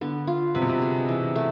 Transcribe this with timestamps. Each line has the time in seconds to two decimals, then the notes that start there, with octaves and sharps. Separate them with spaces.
0.01 D3 B3
0.27 F4
0.55 C3 B4
0.62 B2
0.69 C3
0.82 G#4
1.09 E3
1.36 A3